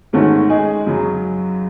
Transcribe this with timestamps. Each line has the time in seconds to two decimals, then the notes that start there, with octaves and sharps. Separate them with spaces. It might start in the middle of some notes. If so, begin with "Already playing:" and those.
0.13 G#2 D#3 A3 C#4 F#4
0.50 G#3 D#4 G#4
0.86 F#2 C#3 F#3